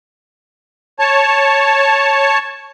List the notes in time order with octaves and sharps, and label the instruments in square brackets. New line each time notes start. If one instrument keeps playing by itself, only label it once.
[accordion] C#5 A5